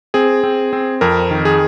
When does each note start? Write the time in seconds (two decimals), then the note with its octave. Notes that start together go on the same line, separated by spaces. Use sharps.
0.14 C4 G#4
0.44 C4
0.73 C4
1.01 F2 A#4
1.31 D#3
1.45 G#4